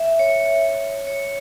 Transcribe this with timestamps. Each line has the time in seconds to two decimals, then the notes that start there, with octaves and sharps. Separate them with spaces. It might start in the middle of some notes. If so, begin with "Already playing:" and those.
Already playing: E5
0.19 C#5
1.07 C#5